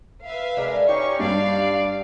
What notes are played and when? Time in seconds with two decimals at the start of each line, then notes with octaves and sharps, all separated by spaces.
0.22 B4 E5 F5
0.57 G#3 D4 A#4
0.89 C#4 D#4 G4 C#6
1.19 G2 D5 F5 C7